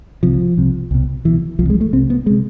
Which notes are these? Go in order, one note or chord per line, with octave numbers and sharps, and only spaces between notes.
C2 C3 F3
C2 C3
C2 B2
C2 B2 E3
C2 C3 F3
G#3
A3
C2 C3 C4
B3
C3 G#3